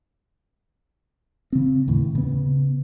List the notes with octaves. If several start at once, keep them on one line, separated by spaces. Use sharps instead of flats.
C#3 C4
D#2 A2
C#3 B3